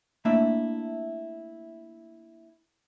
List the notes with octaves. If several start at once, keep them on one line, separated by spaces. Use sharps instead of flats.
A3 A#3 D4 E4 E5